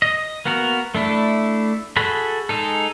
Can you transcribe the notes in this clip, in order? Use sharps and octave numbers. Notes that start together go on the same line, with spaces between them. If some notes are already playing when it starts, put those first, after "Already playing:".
D#5
A#3 B3 F#4 A#4
A3 D4 E4
F#4 G#4 A4 B5
G#3 D#4 A4